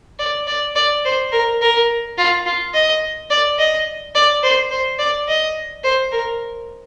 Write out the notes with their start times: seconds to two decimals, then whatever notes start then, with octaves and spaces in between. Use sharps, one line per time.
0.19 D5
0.47 D5
0.76 D5
1.05 C5
1.32 A#4
1.61 A#4
2.18 F4
2.46 F4
2.74 D#5
3.30 D5
3.59 D#5
4.15 D5
4.43 C5
4.71 C5
4.99 D5
5.28 D#5
5.84 C5
6.12 A#4